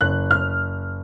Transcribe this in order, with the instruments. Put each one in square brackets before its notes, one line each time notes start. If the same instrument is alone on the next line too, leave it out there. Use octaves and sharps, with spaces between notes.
[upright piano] F#1 F#6
F6